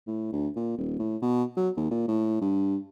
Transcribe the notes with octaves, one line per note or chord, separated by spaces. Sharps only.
A2
D2
A#2
D#1
A2
B2
F#3
D#2
A#2
A2
G2